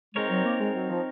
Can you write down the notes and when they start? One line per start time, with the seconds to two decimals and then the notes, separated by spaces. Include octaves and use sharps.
0.15 G#3 C4 D#4 A#4 C#5
0.30 F#3
0.45 A#3
0.60 G#3
0.75 F#3
0.90 F3